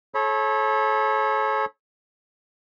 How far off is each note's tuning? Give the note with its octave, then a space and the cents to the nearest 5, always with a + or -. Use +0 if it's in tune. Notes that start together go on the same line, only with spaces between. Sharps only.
A4 -35 C#5 -30 B5 -15